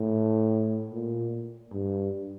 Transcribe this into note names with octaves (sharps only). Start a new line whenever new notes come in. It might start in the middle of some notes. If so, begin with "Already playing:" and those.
Already playing: A2
A#2
G2